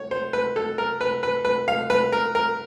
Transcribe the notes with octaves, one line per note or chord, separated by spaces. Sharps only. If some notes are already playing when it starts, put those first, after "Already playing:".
Already playing: C#5
C5
B4
A4
A#4
B4
B4
B4
F5
B4
A#4
A#4